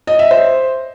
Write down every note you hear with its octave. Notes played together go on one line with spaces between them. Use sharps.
D#5
E5
C5